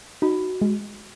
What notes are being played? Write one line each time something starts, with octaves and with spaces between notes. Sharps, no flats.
D#4 F#4
G#3